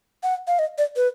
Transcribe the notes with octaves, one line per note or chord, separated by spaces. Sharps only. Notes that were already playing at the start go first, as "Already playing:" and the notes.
F#5
F5
D#5
D5
B4